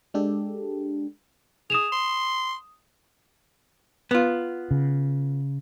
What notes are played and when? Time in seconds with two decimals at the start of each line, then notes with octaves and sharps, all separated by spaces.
0.14 G#3 D4 G4 A4
1.70 G#4 D#6 E7 F7
1.92 C6
4.11 B3 F4
4.71 C#3